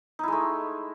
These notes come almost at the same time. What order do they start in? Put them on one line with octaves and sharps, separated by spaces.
D#4 E4 G#3 A3